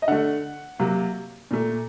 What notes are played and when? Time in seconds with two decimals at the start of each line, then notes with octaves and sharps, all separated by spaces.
0.02 D#5
0.08 D3 A3 F#5
0.79 C3 F#3 A#3
1.51 A#2 A3